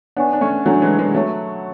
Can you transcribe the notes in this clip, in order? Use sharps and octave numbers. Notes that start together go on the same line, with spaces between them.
B3 D4 C#5 G#5 C#6
D4
A3 C#4
F#3 A3 D4 A4 C#5 G#5
E3 G#3
E3 G#3
F#3 A3 C#5 E5 A5 C#6